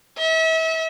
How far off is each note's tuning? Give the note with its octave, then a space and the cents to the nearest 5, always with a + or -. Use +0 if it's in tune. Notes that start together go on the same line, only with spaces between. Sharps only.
E5 -35